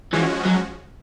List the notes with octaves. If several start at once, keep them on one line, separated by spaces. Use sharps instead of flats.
E3 F3 G#3 C#4 F#4
F#3